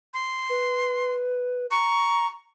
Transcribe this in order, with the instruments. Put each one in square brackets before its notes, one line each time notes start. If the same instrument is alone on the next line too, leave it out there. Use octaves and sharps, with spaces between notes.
[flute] C6
[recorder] B4
[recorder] A#5 [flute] C#6